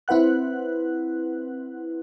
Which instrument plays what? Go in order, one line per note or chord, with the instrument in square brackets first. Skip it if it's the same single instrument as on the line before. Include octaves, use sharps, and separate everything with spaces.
[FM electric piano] C4 E4 B4 F#5 F#6